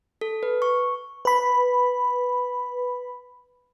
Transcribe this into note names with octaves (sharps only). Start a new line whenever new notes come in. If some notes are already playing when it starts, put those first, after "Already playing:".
A4
B4
C#6
B4 B5